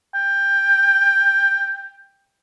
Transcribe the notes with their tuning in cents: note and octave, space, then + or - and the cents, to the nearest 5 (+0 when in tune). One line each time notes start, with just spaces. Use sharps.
G5 +15